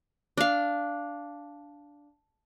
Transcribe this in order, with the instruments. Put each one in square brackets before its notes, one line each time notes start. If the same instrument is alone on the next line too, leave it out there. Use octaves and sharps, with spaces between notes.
[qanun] D4 F5